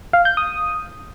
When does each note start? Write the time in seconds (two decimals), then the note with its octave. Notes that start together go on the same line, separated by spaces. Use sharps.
0.13 F5
0.25 G6
0.37 D#6